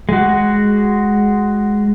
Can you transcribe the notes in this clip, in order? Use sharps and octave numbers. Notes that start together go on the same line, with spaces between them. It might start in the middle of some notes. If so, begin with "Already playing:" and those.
G#3 F#4